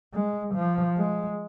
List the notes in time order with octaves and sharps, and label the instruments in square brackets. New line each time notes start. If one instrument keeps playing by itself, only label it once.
[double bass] G#3
F3
G#3